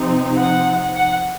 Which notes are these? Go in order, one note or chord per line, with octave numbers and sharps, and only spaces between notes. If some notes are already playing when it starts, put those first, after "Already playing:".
Already playing: C3 F3 C4 D#4
F#5
F#5